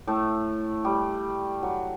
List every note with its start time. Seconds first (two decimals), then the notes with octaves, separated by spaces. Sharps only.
0.07 A2 A3
0.85 G3
1.63 F#3